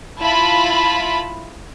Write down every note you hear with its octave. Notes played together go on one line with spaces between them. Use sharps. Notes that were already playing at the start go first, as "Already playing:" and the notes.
E4 F4 A5 B5